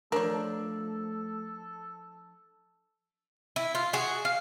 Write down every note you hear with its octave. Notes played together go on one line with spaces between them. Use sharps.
F3 A3 D4 A4 A#4 C#5
E4
F4
F#4 G#4
F5